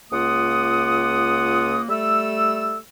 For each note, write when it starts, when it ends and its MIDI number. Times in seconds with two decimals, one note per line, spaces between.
0.11 1.82 37
0.11 1.82 58
0.11 1.82 65
0.11 1.82 78
0.11 1.82 87
1.89 2.77 55
1.89 2.77 57
1.89 2.77 69
1.89 2.77 88